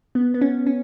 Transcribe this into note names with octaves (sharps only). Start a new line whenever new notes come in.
B3
B3
C#4
C#4